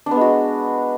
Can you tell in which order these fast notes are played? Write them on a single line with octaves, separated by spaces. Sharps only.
D4 B3 G#3 F#4